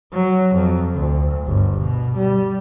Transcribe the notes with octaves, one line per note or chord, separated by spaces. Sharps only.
F#3
F2
D2
G1
B2
G3